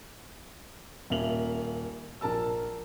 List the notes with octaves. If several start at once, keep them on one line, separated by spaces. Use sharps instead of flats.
D#1 A#3 E5 F7 F#7
A#1 A#4 A5 E6